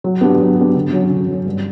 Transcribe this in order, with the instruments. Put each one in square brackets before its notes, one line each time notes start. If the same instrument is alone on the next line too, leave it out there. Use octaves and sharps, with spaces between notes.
[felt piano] F#3
B3 D4 G4
F#3
B3 D4 G4
D3
F#3 C#4
D3
F#3 C#4
G2